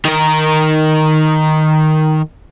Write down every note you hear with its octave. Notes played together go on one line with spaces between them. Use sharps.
D#3 A#4